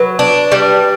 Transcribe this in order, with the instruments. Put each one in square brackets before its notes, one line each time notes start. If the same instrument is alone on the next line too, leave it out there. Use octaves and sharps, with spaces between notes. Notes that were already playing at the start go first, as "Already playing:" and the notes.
Already playing: [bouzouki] F#3 [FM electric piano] B4
[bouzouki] D4
G3